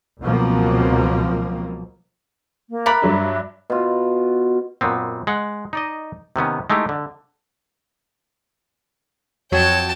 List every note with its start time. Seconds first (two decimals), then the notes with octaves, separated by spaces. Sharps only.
0.21 C#2 B2 F3 F#3 A#3 C4
2.70 A#3
2.86 A3 A#4 B5 D6 F#6
3.02 G2 F#3 D4 E5
3.70 B2 F4
4.81 F#2 A#2 B3 C4
5.27 G#3 F#5
5.73 D#4 D5 D#5
6.36 C3 D#3 B3 C#4
6.70 G#3 A3 D#4 E4 G4
6.89 D3
9.52 F2 F#3 F#4 C#5 G5 A5